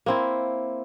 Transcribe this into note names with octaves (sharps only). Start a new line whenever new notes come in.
A#3 C4 E4